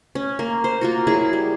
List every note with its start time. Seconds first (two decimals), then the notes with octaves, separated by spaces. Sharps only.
0.15 C#4
0.39 A#3
0.64 C5
0.81 A#3 F4 F#4
1.07 F#3 E4 G#4
1.33 G3